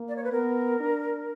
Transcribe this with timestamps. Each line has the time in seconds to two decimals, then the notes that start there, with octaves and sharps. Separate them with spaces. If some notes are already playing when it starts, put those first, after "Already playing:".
Already playing: A#3
0.08 D5
0.16 C#5
0.24 B4
0.32 B3 A#4
0.80 D4